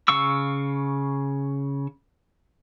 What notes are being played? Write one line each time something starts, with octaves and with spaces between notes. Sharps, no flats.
C#3 F5 C#6 E6